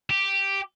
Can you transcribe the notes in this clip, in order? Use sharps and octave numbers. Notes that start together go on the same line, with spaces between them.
G4